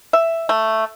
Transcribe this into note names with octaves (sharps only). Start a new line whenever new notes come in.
E5
A3